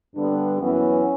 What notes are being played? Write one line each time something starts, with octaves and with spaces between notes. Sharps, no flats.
G2 D3 G3 B3 D4
F#2 E3 B3 C#4